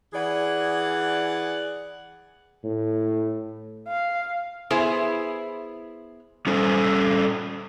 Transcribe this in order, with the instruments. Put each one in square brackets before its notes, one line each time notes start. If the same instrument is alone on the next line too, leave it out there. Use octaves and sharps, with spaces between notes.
[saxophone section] E3 G#4 D5 F#5
[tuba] A2
[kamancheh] F5
[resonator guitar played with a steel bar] B3 E4 G#4 C5
[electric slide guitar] G3 C#4 A4 C5